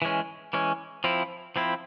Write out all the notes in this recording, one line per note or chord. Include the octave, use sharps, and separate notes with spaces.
E3 G#3 C#4
E3 G#3 C#4
F3 C4 E4
F3 C4 E4